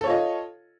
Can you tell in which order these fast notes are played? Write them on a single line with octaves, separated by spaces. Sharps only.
A4 C#5 F4 D#5